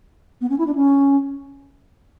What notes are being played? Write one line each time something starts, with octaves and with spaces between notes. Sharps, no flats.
B3
C#4
E4
D4
C#4